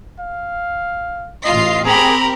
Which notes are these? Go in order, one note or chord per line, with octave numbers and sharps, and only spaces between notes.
F5
A1 F4 D#5 C7
C4 G4 G#4 A#4 A#5 B5